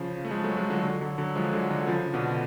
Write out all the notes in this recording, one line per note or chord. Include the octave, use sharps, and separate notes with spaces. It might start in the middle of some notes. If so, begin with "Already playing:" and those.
Already playing: C#3 F3
A3
F3 G#3
F#3 A3
F3 G#3
D3 F#3
D3 F#3
D3 F#3
D3 F#3
F3 G#3
D3 F#3
D3 F#3
C#3 F3
B2 D3